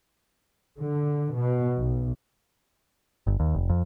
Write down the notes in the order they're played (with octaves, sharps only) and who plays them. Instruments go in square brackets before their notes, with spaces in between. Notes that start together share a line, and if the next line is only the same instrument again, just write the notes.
[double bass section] D3
B2
B1
[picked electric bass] G1
D#2
F1
F2